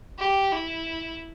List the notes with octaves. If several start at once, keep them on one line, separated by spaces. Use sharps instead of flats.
G4
E4